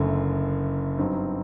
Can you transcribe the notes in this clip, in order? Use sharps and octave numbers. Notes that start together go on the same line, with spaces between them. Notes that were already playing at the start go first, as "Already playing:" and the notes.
Already playing: F#1 F#2 D3 A3
G2 F#3 C4 D#4